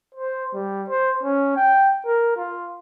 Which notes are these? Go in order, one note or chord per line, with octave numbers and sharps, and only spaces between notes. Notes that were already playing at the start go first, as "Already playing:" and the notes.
C5
G3
C5
C#4
G5
A#4
F4